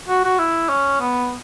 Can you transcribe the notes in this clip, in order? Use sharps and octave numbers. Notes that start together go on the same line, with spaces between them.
F#4
F#4
E4
C#4
B3